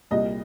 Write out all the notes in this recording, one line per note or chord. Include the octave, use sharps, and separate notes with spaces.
C2 A#2 G3 D#5